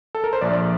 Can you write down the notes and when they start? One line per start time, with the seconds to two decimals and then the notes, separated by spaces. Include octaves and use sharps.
0.15 A4
0.24 A#4
0.33 C5
0.41 A#1 D5